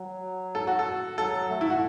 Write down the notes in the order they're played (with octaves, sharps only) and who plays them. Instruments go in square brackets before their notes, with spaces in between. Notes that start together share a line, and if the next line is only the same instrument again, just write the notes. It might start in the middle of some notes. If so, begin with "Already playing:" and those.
Already playing: [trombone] F#3
[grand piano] A4
F#4
A4
[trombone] F#3 [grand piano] A4
[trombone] A3
[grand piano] E4
F#4